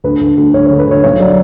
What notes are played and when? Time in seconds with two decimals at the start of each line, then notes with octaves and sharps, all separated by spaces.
0.04 D2 B4
0.21 D2
0.37 D2
0.54 D2 C#5
0.67 C#5
0.70 D3
0.79 B4
0.87 D2 C#5
1.04 B1 C#5
1.20 F#3 D5